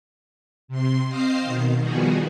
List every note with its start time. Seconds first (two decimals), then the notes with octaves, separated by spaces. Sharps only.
0.68 C3 C6
1.07 C4 C5 D#5 F5 C7
1.42 B2 D#3
1.78 D#3 F3 G3 B3 F#4 G#4